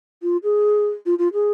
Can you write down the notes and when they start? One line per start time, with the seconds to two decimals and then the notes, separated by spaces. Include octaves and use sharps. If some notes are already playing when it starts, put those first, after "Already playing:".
0.23 F4
0.44 G#4
1.06 F4
1.19 F4
1.33 G#4